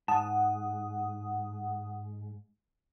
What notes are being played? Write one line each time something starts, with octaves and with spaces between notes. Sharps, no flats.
G#2 F#5 A5 D#6